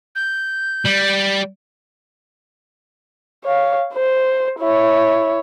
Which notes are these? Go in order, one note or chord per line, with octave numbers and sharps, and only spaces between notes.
G6
G3
C#5 F5
C5
E4 C#5